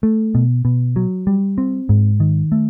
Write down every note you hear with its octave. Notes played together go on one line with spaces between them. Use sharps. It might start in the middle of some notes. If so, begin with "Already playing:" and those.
A3
B2
B2
F#3
G3
C4
G#2
D#3
A3